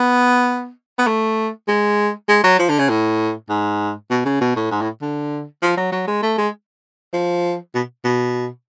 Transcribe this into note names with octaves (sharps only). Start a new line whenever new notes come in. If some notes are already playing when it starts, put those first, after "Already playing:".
Already playing: B3
B3
A3
G#3
G#3
F#3
F3
D3
C#3
A2
G#2
B2
C#3
B2
A2
G#2
A2
D3
F3
F#3
F#3
G#3
A3
G#3
F3
B2
B2